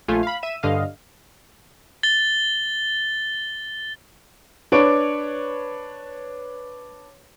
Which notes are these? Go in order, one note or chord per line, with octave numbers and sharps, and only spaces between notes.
A#1 A3 F4 G#5
F5 B5
E5 D#7 E7
G2 D3 D#5 F5
A6 G7
D4 B4 C#5 D7